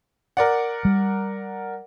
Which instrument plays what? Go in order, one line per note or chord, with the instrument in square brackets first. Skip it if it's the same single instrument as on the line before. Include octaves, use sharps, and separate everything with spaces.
[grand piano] A#4 D5 F#5
[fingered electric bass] G3